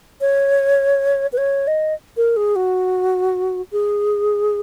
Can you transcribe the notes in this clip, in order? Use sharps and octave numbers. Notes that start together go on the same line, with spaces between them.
C#5
B4
C#5
D#5
A#4
G#4
F#4
G#4